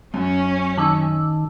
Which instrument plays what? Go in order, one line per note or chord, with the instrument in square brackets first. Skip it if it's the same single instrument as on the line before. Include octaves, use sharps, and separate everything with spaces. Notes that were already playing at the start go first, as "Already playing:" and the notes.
[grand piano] F#2 [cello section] C#4
[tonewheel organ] D#3 [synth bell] A5 D6 E6